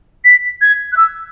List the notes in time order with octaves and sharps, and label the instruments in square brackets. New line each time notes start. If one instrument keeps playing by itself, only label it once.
[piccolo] B6
G#6
F#6
E6